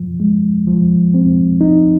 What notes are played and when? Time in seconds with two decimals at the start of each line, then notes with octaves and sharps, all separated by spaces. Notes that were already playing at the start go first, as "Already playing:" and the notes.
Already playing: F3
0.20 G#3
0.67 F3
1.14 C4
1.61 D#4